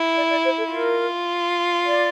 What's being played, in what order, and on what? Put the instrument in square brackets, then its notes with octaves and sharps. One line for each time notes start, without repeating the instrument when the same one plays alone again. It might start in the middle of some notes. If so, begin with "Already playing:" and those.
Already playing: [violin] E4
[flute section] D5
D5
C5
A4
[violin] F4 [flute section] A#4
[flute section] D5